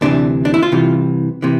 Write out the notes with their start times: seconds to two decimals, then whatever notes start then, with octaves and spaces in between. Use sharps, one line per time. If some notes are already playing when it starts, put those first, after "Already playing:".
0.01 D2 C3 E3 D4
0.45 D4
0.54 E4
0.63 F4
0.72 C2 C3 E3
1.42 C3 E3